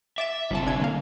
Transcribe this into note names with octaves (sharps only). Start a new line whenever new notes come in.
E5 D6 A6 E7
G1 C#2 C3 A5
D4 G#6
D3 A#3 F5